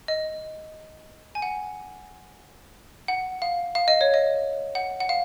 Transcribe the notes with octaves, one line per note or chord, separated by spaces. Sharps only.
D#5
G#5
F#5
F#5
F5
F5
D#5
C#5
D#5
F#5
F#5
F5